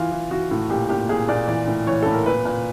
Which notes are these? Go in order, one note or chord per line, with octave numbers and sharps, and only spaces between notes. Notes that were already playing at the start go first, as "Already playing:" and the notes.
Already playing: E3 F4
E3
E3 F#4
A2
A#2 G4
A#2 G4
A#2 G#4
A#2 D5
E3 D5
A2
E3 C#5
A2 A4
A#4
A#2 B4
A#2